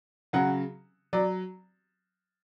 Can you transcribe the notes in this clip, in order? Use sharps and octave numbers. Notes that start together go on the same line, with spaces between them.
C#3 F#3 F#5
F#3 D5